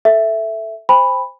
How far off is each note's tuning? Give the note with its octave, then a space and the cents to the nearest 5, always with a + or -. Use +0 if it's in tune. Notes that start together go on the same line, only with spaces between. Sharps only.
A4 +0 E5 +0
C5 +0 G#5 -45 B5 +0